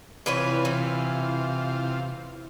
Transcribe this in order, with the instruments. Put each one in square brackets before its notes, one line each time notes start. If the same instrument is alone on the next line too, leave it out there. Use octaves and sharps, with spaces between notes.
[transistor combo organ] C3 F4 [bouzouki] E3 B4 C#5
[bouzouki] E3